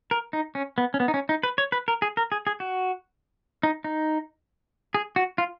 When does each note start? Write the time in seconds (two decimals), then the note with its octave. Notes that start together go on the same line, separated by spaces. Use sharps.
0.11 A#4
0.33 D#4
0.55 C#4
0.78 B3
0.94 C#4
1.00 B3
1.08 D#4
1.14 C#4
1.29 D#4
1.43 B4
1.58 C#5
1.72 B4
1.88 A#4
2.02 G#4
2.17 A#4
2.32 G#4
2.47 G#4
2.60 F#4
3.63 D#4
3.84 D#4
4.94 G#4
5.16 F#4
5.38 F4